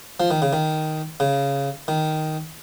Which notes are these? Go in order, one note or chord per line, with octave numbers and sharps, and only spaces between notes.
F3
D#3
C#3
D#3
C#3
D#3